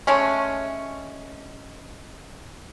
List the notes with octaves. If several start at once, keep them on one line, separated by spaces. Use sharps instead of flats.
G#3 A3 C#4